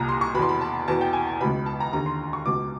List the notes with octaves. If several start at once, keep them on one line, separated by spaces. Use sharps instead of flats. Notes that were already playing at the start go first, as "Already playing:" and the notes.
Already playing: C2 A#2 A#5
C6
C#6
E2 B2 B5 C6
B5
A5
E2 B2 A5
G5
G#5
A5
C#2 B2 B5
A5
A#5
D#2 D3 A#5
C6
C#6
C#2 B2 D6